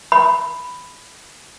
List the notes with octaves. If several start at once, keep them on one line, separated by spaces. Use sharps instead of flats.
B5